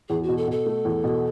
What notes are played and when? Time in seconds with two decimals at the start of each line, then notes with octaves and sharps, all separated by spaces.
0.09 E2 G#4
0.23 F#4
0.28 B2
0.37 A4
0.47 B2 A4
0.66 A3
0.85 E2
1.04 B2